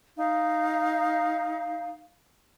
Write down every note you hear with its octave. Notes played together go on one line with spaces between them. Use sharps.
D#4 F5